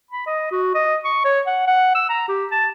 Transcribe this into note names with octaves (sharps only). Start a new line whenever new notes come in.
B5
D#5
F#4
D#5
C#6
C#5
F#5
F#5
E6
A#5
G4
A5